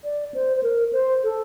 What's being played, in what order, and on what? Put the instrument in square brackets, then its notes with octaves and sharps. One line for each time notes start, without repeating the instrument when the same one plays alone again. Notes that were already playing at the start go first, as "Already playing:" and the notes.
[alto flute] D5
C5
C5
A#4
C5
A4